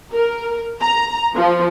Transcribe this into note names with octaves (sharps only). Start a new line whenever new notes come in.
A#4
A#5
F3